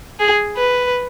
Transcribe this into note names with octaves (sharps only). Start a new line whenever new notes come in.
G#4
B4